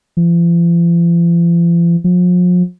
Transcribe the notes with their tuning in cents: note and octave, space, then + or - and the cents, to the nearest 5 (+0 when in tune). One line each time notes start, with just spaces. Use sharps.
F3 -45
F3 +40